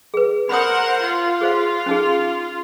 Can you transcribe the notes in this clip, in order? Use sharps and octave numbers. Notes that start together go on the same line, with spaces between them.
G#4 B4
A#4 C5 F#5 B5 D#6
F4
G#4 C5 F5
C#4 D#4 G#4